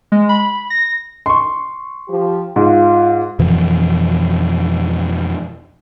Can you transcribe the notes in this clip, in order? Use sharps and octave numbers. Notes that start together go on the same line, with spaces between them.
G#3
B5
A#6
C6 C#6
F3 G4
G#2 F4
F2 B2 E3 F3